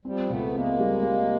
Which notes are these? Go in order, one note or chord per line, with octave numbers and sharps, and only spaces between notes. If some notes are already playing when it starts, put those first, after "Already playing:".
F3 G3 C4
C#2 A3 B3
G#3 A#3 C4
G3
G3